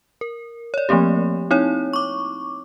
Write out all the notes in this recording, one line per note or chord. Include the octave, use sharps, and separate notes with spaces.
A#4
C#5 D5
F3 A3 A#3 C4 G4
C4 D#4 E4 C#5
C#6 D6